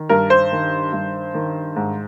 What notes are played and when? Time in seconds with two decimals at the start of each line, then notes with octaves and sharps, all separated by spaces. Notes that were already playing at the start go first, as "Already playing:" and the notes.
Already playing: D#3
0.09 G2 A#4
0.30 C5
0.52 D#3
0.92 G2
1.34 D#3
1.76 G#2